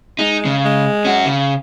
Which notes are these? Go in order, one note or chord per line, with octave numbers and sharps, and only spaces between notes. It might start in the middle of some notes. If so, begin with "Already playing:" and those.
G#3 D#4
C#3
G#3
C#4 F#4
C#3